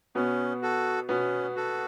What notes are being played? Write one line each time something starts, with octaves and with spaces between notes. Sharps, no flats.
B2 B3 C#4
F#4 A4
B2 B3 C#4
F#4 A4